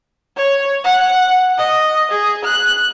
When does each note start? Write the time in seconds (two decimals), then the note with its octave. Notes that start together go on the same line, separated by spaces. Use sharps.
0.37 C#5
0.84 F#5
1.58 D#5
2.11 G#4
2.44 F#6